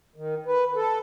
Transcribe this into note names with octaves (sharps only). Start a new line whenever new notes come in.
D#3
B4
A4